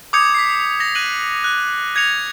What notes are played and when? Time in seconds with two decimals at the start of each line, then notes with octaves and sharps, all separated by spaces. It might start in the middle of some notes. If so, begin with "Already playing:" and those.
0.13 D6 D#6 G6 G#6 C#7 F7
0.35 B6 C7
0.80 A#6 F7
0.95 F#6 D#7 F#7
1.44 F#6
1.96 G#6 A#6 C#7 F7